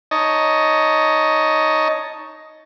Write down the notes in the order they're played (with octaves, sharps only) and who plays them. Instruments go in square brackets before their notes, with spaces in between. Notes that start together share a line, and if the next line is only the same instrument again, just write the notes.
[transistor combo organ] D#4 C#5 D#5 A5